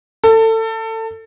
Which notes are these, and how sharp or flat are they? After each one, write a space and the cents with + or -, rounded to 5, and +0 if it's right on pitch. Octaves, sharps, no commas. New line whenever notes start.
A4 +25